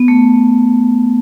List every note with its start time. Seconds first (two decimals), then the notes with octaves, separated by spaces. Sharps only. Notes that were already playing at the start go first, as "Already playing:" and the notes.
Already playing: B3
0.08 A3